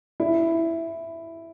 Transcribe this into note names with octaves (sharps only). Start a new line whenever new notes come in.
E4